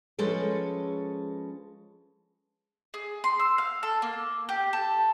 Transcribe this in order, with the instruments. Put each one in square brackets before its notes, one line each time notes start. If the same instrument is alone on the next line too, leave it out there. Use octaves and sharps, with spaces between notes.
[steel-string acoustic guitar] F3 G#3 C#4 A4 B4
[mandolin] G#4
C6
E6
F5
A4
A#3
G4
A4